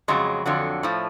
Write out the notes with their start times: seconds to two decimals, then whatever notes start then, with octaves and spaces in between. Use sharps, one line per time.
0.08 F2 C#3 F#3 G#3
0.46 F2 D3 F#3
0.83 A2 F3